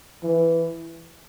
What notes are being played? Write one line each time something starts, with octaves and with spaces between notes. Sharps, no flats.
E3